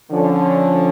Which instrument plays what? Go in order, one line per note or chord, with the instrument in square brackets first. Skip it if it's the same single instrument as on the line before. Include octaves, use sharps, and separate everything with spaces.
[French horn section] D3 F3 C#4